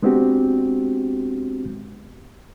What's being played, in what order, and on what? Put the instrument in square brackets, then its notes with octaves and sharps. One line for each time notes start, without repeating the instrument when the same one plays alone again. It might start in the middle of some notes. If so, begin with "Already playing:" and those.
[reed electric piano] G#3 B3 C4 D4 F#4 G4